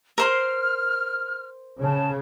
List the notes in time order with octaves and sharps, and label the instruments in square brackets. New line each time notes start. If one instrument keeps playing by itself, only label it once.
[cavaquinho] A#4 C5 C6 [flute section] F6
[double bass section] C#3 [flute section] A5